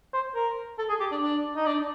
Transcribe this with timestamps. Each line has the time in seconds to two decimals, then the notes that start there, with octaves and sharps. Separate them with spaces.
0.14 C5
0.35 A#4
0.79 A4
0.89 G#4
1.00 G4
1.12 D4
1.22 D4
1.56 D#4
1.66 D4